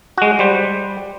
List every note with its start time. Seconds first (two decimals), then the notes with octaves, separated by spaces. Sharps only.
0.18 G#3 F#4
0.39 G3 C5